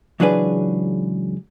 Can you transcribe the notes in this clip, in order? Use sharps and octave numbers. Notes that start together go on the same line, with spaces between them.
C#2 E3 F#3 D4 G#4 B4